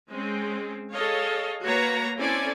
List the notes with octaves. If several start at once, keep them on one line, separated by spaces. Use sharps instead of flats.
G#3 C4 C#4
G#4 A4 C#5 D#5 F5
A#3 F#4 B4 C#5 A#5
C4 C#4 E4 A4 D5 G#5